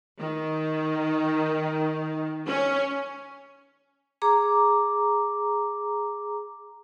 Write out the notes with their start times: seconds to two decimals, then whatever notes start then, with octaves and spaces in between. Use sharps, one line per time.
0.19 D#3
2.46 C#4
4.22 G#4 A#5 D6